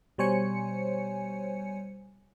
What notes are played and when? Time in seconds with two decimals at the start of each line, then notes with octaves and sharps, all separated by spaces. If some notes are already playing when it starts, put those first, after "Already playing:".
0.18 B2 G3 C5 C#5 G#5 C#7